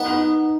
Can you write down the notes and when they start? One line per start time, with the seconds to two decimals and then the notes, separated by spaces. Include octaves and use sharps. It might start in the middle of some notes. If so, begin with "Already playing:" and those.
Already playing: B3 D#4
0.12 D#4